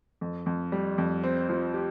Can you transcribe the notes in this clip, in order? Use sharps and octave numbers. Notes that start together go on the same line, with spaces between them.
F2
F2
G3
F2
C4
F3
G4